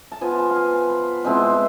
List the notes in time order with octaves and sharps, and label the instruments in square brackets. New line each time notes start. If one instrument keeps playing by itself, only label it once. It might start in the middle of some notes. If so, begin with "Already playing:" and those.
[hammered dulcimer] A5
F3 B3 F4 G#5
A5
F5
G#5
A5
B5
B2 G#3 C4 E4 A5
B5